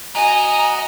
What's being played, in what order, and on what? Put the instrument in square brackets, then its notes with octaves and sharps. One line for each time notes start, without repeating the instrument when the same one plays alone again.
[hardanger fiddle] F#4 D#5 [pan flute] G#5 [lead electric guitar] A#5